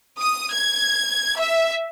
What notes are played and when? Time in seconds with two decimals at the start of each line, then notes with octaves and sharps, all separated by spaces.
0.21 D#6
0.52 G#6
1.39 E5